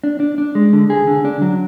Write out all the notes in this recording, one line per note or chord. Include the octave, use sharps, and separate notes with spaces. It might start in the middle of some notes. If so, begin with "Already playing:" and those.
D4
D4
D4
G#3
D3
G#4
D3
D4
F#3